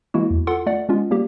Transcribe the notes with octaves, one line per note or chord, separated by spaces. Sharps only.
E3 G#3 A#3 E4 F#4
E2
F4 A4 F#5 C6
A3 D5 F#5
G#3 B3 C#4 F4
G3 A#3 G4